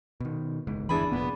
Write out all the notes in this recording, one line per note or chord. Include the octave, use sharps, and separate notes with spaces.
B2 D#3
F#1 C#2 G#2
G1 E2 E3 D4 G#4 B5
F1 A#2 B3